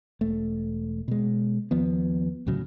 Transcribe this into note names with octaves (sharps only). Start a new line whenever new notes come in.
E1 A3
B2 G#3
D#2 F3 B3
D2 A2 C#3 F#3